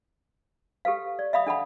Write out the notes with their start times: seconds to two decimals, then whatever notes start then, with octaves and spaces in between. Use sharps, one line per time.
0.85 G4 A4 B4 F5
1.19 D5
1.33 E5 F5 B5 D#6
1.46 D4 A4 F#5 B5